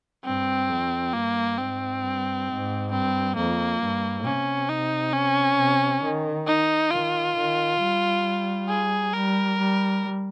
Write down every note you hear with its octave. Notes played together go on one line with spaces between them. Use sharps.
G2 C4
F2
G2 A#3
G#2 C4
G2
G#2
G2 C4
F2 A#3
G2
C3 C#4
D#4
C#4
C3
D#3
D#4
D#3 F4
D#3
G3
G#4
G3 A#4
G3